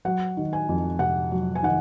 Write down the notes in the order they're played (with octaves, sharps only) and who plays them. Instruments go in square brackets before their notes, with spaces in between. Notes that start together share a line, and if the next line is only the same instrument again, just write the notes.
[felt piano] F#3 F#5
D#3
G#5
F2
C3 F#5
F#3
G#5
D#3 F#5